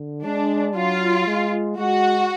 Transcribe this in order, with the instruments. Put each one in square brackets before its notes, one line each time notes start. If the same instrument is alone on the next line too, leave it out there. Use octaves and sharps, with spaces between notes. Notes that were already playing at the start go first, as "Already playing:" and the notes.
Already playing: [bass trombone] D3
[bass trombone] G#3 [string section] D4
[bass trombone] F#3 [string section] F4
[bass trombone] G#3
[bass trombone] G#3 [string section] F#4